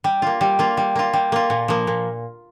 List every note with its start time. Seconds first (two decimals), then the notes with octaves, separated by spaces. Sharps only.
0.04 G3
0.22 A#3 F4
0.41 G3
0.59 A#3 F4
0.77 G3
0.96 A#3 F4
1.13 G3
1.32 A#3 F4
1.50 A#2
1.68 F3 A#3
1.87 A#2